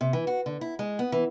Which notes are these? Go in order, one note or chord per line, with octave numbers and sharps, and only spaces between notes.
C3
E3
F#4
D3
E4
G#3
B3
E3